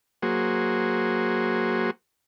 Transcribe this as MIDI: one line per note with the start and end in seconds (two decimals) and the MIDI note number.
0.22 1.91 54
0.22 1.91 58
0.22 1.91 66
0.22 1.91 68
0.22 1.91 72